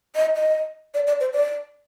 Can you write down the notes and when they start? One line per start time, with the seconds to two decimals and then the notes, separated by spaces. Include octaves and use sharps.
0.15 D#5
0.35 D#5
0.94 D5
1.07 D5
1.20 C5
1.33 D5